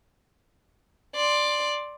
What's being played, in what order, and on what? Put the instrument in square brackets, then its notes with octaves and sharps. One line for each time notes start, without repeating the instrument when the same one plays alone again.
[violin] D5 C6